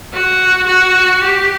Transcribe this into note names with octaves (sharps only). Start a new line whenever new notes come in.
F#4
F#4
G4